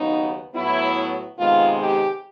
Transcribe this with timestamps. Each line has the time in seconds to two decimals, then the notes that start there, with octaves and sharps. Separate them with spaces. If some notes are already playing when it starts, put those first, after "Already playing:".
Already playing: D#2 C#3 F#3 B3 D#4
0.54 A2 F#3 B3 E4
1.38 C3 D#3 G#3 B3 F4
1.80 G4